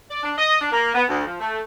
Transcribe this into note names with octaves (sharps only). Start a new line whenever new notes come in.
D5
D4
D#5
D4
A#3
B3
D2
F3
A3